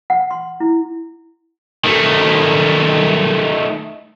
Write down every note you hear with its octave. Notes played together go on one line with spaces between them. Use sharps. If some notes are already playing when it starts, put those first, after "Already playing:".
F#5
C6
E4
D#3 A3